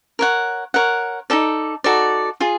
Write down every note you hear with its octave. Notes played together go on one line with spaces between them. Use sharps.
A#4 C#5 F#5
A#4 C#5 F#5
D#4 F#4 A4 D5
D#4 F#4 A4 D5
F4 G#4